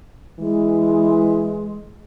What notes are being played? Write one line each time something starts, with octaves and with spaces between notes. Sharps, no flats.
E3 G#3